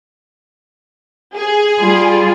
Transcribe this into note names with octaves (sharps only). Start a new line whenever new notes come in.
G#4
G3 F4